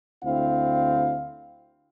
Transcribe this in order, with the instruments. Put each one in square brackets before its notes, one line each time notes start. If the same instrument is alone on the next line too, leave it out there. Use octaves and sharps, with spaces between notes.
[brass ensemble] D2 C4 E4 F5